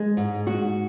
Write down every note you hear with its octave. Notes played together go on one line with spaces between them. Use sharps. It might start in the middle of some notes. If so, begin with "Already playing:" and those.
Already playing: G#3
G#2
F#4